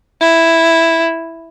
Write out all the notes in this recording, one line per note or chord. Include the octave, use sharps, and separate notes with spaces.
E4